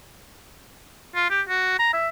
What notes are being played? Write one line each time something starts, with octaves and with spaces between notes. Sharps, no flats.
F4
G4
F#4
A#5
E5